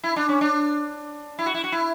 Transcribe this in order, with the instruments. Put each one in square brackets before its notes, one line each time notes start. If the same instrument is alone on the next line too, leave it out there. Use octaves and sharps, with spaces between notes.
[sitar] E4
D4
C#4
D4
E4
F#4
E4
F#4
E4